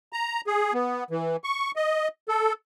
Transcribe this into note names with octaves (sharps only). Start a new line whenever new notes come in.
A#5
G#4
B3
E3
C#6
D#5
A4